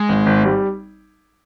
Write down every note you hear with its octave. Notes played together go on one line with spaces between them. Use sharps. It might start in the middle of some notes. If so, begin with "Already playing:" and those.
Already playing: G#3
G#1
G#1
G3